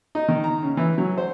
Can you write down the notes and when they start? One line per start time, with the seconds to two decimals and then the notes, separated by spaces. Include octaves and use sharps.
0.15 D#4
0.28 D#3
0.44 A#5
0.63 C#3
0.77 E3
0.98 F#3
1.18 C5